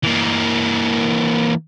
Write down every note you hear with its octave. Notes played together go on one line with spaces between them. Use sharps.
E3 A#3